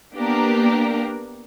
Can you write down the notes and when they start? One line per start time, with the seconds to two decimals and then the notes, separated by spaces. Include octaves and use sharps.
0.14 A#3 B3 D4 G4 A#4